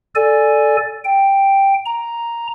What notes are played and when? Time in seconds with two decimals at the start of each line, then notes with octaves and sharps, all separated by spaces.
0.15 A4 D5 G#5
1.05 G5
1.86 A#5